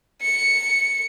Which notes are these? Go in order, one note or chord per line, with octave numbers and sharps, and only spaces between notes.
C#7